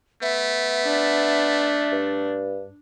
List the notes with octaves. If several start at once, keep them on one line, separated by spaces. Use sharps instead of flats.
A3 B3 E5
D4
G2